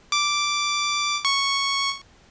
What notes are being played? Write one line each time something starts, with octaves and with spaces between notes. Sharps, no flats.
D6
C#6